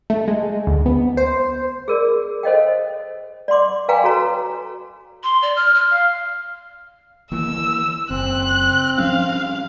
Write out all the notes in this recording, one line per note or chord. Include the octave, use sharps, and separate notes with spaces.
A3
G#3
D2
B3
C5
G#4 A#4 D5
A4 C5 C#5 D#5 F5 G5
D5 F#5 C6 D6
B4 F5 G5 G#5 A#5 D6
F#4 A4 C#5 A#5
C6
D5
F6
F6
F5
D#3 E3 A#3 E6
F#1 C4 F#6
F3 G3 C#4 F5